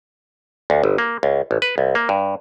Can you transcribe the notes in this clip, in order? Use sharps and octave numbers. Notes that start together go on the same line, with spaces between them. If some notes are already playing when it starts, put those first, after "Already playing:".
D2
G1
A#3
C#2
A1
B4
C2
A#3
G2